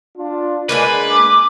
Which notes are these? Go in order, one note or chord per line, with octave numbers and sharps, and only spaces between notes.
D4 F4
G#3 A#3 D4 B4 G#5
D6